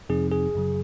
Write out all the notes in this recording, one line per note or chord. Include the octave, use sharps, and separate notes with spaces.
F2 C3 F3 C4 D#4 G#4
G#4
F#2 C#3 F#3